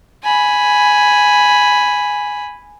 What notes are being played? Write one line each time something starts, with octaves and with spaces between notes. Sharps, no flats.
G#5 B5